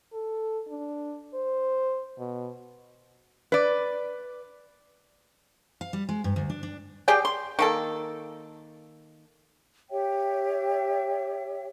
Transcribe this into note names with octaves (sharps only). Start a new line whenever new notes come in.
A4
D4
C5
B2
B4 D5
F5
G3
G#3
G2
D2
D4
D4
G4 G#4 D5 G5
C6
D#3 A#3 A4
G4 C#5 E5 G5